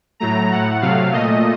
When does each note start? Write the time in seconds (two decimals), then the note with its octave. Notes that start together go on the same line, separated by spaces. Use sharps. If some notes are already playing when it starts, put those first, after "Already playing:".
0.20 A2 F#3 A3 A#5
0.51 A2 A3 F#5
0.82 C3 F#3 A3 F5
1.12 A#2 A3 D#5